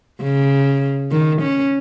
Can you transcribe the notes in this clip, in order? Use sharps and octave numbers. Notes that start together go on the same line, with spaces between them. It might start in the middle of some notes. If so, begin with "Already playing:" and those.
C#3
D#3
C#4